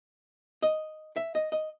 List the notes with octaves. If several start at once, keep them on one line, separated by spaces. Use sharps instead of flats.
D#5
E5
D#5
D#5